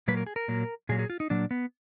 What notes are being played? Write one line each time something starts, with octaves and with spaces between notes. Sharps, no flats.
A#2 F#3 A#3 B4
A#4
G#4
A#4
A#2 F#3 A#3
A#2 F#3 A#3 G#4
G#4
F4
D#4
A#2 F#3 A#3 D4
B3